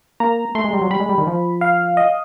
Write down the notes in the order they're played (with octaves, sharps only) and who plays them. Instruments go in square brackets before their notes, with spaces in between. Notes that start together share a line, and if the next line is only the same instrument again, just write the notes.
[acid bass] A#3 [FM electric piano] A#5
[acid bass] A3 [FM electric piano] C6
[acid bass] G#3
G3
F#3
[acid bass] G3 [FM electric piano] B5
[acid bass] G#3
G3
D#3
F3
[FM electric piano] F5
D#5